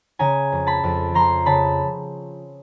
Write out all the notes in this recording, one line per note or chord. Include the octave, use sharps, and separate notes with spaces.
C#3 G#5 A#5
F2
A5 B5
F2
F3 A#5 C6
C#3 A5 B5